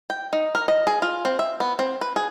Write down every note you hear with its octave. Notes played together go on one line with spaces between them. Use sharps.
G5
D#4
A#4
D#5
G#4
F4
C4
E5
B3
C4
B4
G#4